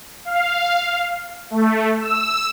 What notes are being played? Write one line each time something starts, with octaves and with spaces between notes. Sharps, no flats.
F5
A3
E6